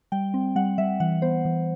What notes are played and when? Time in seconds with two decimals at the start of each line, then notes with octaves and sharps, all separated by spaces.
0.12 G3 G5
0.34 C4
0.55 G3 F#5
0.78 G3 E5
1.00 E3 F#5
1.22 B3 C5
1.45 E3